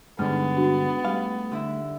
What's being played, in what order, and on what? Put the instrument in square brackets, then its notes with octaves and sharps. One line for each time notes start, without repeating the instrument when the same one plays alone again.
[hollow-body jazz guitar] G2 D3 [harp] G#3 D#4 [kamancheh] B3 [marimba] F6
[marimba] D4 F#4
[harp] G3 [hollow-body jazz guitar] A3 F5
[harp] D3 E4 E5